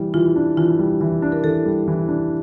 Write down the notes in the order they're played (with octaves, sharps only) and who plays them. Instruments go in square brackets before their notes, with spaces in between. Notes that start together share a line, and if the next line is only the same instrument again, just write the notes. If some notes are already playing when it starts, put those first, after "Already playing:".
Already playing: [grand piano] E3 G3
[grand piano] E3 [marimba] F4
[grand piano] D4
[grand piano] E3 [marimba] F4
[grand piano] G3
E3
D4
[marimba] A#4
[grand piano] E3 [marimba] A4
[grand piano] G3
E3
D4